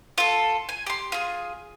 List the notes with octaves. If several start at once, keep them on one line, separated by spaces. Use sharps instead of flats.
F4 A4
G#5
G4 C6
F4 G#4